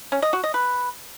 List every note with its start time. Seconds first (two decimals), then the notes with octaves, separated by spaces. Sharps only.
0.12 C#4
0.22 D#5
0.33 F#4
0.44 D#5
0.54 B4